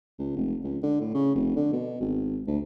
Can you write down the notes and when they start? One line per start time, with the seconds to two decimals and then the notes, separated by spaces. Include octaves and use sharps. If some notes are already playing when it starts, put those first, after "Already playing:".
0.19 C#2
0.36 F1
0.64 C#2
0.83 D3
1.01 A2
1.15 C#3
1.35 F1
1.56 D3
1.73 B2
2.00 G#1
2.47 D2